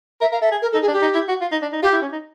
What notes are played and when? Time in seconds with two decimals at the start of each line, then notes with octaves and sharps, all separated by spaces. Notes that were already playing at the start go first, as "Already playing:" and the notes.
0.21 A#4 E5
0.32 A#4 F5
0.41 A4 E5
0.52 G#4
0.62 A#4
0.72 A4
0.75 D#4
0.81 G#4
0.88 D4
0.92 G4
1.02 D#4
1.15 E4
1.29 F#4
1.41 F4
1.52 D#4
1.62 D4
1.73 D#4
1.82 F4 G4
1.93 E4
2.02 C#4
2.12 D#4